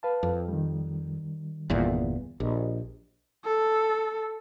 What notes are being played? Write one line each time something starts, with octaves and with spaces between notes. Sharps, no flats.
B4 F5 A5
F2
D#3 G3
G1 E2 A#2
A#1 G4 D#5
A4